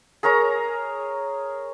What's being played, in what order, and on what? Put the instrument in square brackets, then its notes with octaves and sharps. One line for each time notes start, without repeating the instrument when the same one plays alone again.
[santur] G#4 A#4 C#5 A#5